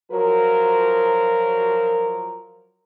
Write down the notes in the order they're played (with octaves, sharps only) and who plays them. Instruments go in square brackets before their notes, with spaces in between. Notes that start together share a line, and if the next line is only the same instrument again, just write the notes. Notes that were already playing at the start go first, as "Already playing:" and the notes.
[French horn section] F3 F#3 A#4